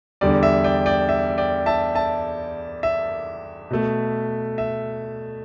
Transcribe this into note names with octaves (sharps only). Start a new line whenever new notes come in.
E2 D3 G3 D5
E5
D5 G5
D5 G5
E5
D5 G5
E5 A5
E5 A5
E5
B2 A3
E5